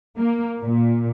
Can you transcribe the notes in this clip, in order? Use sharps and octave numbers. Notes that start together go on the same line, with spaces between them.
A#3
A#2